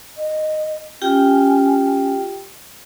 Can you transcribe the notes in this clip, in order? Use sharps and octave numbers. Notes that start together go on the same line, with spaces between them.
D#5
C#4 F4 G4 G5